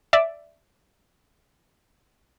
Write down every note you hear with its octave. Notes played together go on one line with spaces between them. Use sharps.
D5 E5